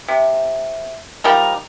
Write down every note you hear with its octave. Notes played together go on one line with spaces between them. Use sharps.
C3
F3 G3 D#4 A#4